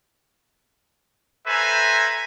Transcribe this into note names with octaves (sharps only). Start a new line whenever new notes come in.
A4 B4 C5 E5 G#5 A#5